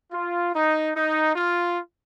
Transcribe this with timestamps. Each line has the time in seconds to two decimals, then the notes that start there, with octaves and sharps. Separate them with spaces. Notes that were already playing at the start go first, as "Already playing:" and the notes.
0.12 F4
0.54 D#4
0.95 D#4
1.35 F4